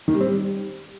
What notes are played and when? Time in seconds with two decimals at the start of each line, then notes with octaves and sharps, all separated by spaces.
0.08 D#3
0.14 G3
0.21 C4
0.27 G3